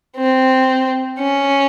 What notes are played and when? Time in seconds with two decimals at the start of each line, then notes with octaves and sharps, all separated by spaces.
0.17 C4
1.19 C#4